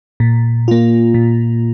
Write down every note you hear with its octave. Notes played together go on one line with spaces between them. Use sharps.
A#2
A#3 F4
A#2